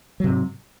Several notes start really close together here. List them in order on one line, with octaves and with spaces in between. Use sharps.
F#3 C3 G#2